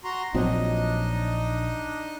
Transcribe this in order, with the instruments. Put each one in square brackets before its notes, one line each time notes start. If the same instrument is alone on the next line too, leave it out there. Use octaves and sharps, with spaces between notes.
[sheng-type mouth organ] F#4 A#5 C6
[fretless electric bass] A#1 F#3 C4 [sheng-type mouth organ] D4 D#4 D#5